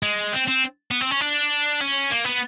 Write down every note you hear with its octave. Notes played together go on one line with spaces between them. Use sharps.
G#3
C4
C4
B3
C4
C#4
D4
C#4
A#3
B3